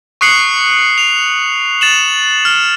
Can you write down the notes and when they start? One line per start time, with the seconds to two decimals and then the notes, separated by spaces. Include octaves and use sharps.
0.21 C#6 D#6 F#6 C7 C#7 F#7
0.98 F7
1.81 A6 E7 F#7
2.45 F6